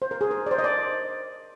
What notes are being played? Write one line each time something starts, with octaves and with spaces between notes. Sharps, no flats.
C5
A#4
G#4
A#4
D5
C5
D#5
D5